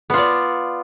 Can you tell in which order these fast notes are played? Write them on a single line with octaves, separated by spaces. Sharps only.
B3 F4 D5